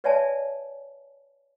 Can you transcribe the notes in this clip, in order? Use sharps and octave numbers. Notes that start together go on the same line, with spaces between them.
B4 C#5 D5 E5 G#5 A5